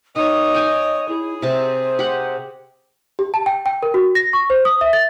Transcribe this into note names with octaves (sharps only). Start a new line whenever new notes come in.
D#3 C#5 D#5 D#6
G5 G#5 D6
E4 G#4
C3 C5 A5
G4 F#5
G4
A5
G5
G5
A#4
F#4
A#6
C#6
C5
D#6
E5
A6